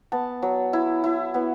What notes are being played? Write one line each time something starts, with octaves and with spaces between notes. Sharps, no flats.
B3 A5
F#3
E4
E4
B3